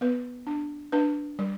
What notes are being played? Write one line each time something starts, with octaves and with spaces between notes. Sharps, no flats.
B3 B4
D4
D4 B4
G3